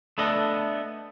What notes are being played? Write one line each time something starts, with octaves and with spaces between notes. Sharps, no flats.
A3 B3 D4 A4 D#5